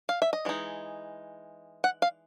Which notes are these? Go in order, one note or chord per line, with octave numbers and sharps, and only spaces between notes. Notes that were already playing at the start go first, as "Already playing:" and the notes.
F5
E5
D#5
E3 G#3 D#4
F#5
F5